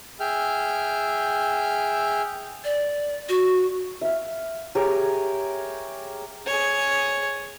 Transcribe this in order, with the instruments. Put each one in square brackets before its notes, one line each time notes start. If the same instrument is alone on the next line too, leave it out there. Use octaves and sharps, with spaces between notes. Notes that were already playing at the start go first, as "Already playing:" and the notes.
[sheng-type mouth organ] G#4 E5 G5 F6
[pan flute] D5
F#4
[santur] E5 F5
G4 G#4 A#4 C#5
[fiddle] G#4 C#5